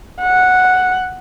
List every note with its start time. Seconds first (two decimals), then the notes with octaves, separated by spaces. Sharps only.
0.22 F#5